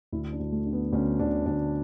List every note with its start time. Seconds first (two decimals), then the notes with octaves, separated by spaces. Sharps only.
0.12 D2 E4
0.33 D4
0.40 D2
0.52 A3
0.66 D3
0.73 B3
0.93 D2 C#4
1.19 D2 D4
1.46 D2 D4